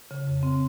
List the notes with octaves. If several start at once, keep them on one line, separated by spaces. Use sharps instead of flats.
C#3
F2
C4